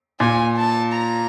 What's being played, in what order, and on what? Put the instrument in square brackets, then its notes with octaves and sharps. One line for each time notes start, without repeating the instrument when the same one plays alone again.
[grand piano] A#2 [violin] G#5
[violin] A5
A#5